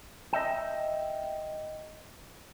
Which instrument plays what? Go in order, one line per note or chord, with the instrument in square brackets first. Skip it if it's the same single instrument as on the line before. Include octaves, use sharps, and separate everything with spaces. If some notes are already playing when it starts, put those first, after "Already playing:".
[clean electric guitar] D#5 E5 G5